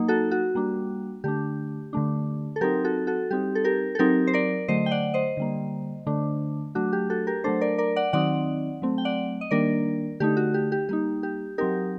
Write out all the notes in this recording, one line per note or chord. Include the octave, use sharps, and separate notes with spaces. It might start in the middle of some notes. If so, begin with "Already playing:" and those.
Already playing: F#3 A#3 D#4
F#4 A4
F#4
G3 A#3 D4
D3 A3 D4 G4
D3 A3 D4
A4
F#3 C4 D#4 G4 A#4
F#4 A4
F#4 A4
G3 C4 D#4 G4
A4
G4 A#4
A4
F#3 C4 D#4 G4 A#4
C5
A#4 D5
D3 F#3 A3 C5 D#5
G5
D5 F#5
C5 D#5
D3 G3 A#3
D3 A3 D4
F#3 A3 D4 F#4
G4
F#4 A4
G4 A#4
F#3 A3 D4 A4 C5
A#4 D5
A#4 D5
D5 F#5
D#3 F#3 C4 D#4 D5 F#5
F#3 A3 C4
G5
D5 F#5
D#5
D#3 G3 A#3 D4 A#4 D5
D3 A3 D#4 G4
F#4
G4
G4
G3 A#3 D#4 G4
G4
F#3 C4 D#4 G4 A#4